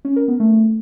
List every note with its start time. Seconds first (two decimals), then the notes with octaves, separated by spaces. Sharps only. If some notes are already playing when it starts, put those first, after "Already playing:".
0.05 C#4
0.16 A#4
0.28 B3
0.40 A3